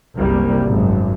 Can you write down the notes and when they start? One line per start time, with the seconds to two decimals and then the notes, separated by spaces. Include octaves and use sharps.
0.18 F#1 C2 G3 A#3
0.67 G#1 F#2